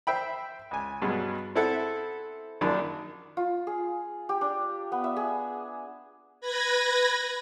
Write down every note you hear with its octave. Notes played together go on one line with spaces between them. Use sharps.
C5 E5 G5 B5
C#2 G#5
G2 B2 F#3 G#3
C4 E4 G#4 A4 E5 F#5
A#1 F#2 D#3 F3 D4 B5
F4
G#4
G4
D4
B3
E5
G#4
B4 B5 G#6 A#6